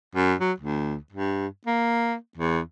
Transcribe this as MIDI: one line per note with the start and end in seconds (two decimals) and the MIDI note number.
0.16 0.34 42
0.41 0.52 54
0.60 0.96 38
1.12 1.47 43
1.67 2.15 58
2.37 2.59 40